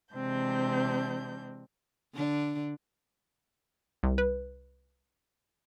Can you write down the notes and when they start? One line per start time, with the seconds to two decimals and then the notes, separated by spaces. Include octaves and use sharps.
0.15 C3 E3 G#3 C4 D4 G6
2.14 D3 D4
4.03 C2
4.18 B4